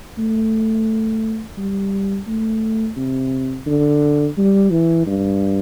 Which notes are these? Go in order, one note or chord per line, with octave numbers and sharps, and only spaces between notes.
A3
G3
A3
C3
D3
G3
E3
G2